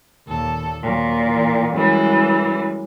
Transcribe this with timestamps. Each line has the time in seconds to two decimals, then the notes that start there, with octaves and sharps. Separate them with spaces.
0.28 D#2 A#2 A4
0.82 D#2 A#2 F#3
1.22 E3
1.74 F#2 E3 G3 G#3